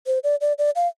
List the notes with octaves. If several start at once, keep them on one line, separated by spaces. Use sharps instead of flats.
C5
D5
D5
D5
F5